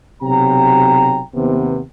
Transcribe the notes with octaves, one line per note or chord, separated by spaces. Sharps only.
B1 C3 F#3 G5 A#5
D#2 C3 B3